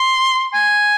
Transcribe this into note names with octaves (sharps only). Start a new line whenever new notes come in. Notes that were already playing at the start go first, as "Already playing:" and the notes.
Already playing: C6
G#5